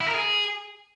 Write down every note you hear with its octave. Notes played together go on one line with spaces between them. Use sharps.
E4
A#4
G#4